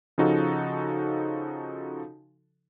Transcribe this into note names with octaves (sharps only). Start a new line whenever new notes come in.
C#3 F3 D#4 F#4 A4